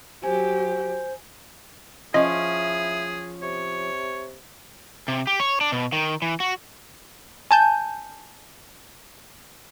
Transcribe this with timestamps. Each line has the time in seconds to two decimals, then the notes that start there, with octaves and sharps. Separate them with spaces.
0.24 F#3 G4 C5 G#5
2.14 F3 C#4 E4 G#4 D#5
3.42 C3 C#5
5.08 C3
5.27 G4
5.40 C#5
5.61 D4
5.72 B2
5.92 D#3
6.22 E3
6.40 F#4
7.51 G#5 A5 G6